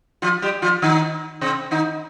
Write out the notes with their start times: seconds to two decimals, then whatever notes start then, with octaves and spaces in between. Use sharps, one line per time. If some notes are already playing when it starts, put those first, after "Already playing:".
0.22 F3 F4
0.42 G3 G4
0.62 F3 F4
0.82 D#3 D#4
1.41 C3 C4
1.71 D#3 D#4